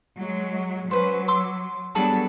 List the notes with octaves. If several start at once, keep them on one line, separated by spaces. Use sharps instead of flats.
F#3 G#3
F#3 C#4 B4 C5
C6 D6 E6
F#3 G3 B3 D4 G#4 A4